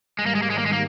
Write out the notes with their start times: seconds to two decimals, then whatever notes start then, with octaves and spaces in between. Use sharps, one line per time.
0.19 G#2 D#3 G3 G#3
0.26 A#3
0.35 G#3
0.42 A#3
0.50 G#3
0.58 A#3
0.66 G#3
0.73 A#3